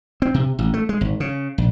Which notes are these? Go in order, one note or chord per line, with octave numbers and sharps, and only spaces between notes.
C4
C3
A1
A3
G#3
G#1
C#3
A#1